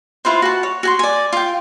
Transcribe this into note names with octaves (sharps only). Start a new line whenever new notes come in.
E4 F4 B4 C5
F#4 A5
C#5
F#4 G#5 C6
D5 G#5
F4 G5